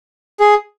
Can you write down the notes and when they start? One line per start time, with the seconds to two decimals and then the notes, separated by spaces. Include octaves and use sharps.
0.40 G#4